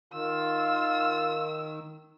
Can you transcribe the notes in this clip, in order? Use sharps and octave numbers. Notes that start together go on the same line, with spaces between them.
D#3 F4 E6